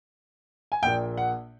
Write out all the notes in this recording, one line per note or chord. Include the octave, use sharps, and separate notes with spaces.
G#5
A#1 A#2 G5
F#5